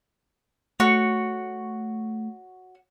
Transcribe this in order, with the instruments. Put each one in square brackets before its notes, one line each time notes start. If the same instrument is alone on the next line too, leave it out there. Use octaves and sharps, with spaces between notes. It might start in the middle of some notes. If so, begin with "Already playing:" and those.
[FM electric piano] A3 [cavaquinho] F#4 C#5